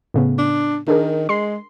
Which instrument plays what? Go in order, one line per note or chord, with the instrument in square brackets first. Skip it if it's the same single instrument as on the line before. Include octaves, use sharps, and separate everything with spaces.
[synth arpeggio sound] A2 C#3 B3
[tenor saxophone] D4
[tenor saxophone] D#3 [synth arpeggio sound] D4 G#4 A#4
[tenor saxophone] G#3 [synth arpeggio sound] C6 C7